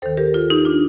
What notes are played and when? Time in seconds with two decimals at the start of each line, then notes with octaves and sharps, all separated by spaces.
0.02 D#2 D#3 A4 C5
0.17 G4 A#4
0.34 F4 A4
0.50 D#4 G4
0.65 D4 F4